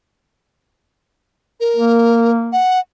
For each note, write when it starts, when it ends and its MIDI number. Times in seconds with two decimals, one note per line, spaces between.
1.60 2.31 70
1.76 2.59 58
2.53 2.79 78